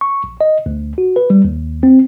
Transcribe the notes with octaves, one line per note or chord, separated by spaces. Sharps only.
C#6
A#1
D#5
D2
F#4
B4
G3
D#2
C4